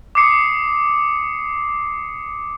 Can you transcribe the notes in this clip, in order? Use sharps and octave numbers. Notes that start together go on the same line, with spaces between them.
D6 D#6 C7 C#7